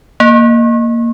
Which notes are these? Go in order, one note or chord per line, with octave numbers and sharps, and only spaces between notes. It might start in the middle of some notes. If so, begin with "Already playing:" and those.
A#3